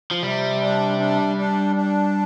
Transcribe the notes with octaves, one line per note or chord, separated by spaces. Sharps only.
F3
C3 G3
D4
D4
D4
D4